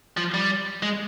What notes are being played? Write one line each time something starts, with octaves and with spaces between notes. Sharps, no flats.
F3
G3
G#3